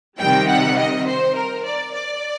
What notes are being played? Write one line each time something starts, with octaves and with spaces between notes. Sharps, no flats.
C3 D#3 G3 G5
F#5
D#5
C5
A#4
D5
D5